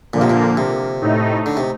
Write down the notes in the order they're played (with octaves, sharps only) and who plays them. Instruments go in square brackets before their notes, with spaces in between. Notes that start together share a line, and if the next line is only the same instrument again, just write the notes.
[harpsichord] A#2 [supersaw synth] D3 F3 A#3
[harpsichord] C3
A#2
C3
[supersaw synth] A2 A3 D#4
[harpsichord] D3
C3